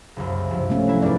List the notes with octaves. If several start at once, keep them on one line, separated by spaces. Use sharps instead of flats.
F#1 C2 F#2
G2 C3 F3
A3 C#4
F#3 E4
G#2 B4 D5